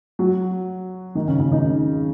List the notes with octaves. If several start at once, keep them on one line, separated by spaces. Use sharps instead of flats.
F#3 F#4
D#3 D#4
C#3 C#4
C#3 C#4
D#3 D#4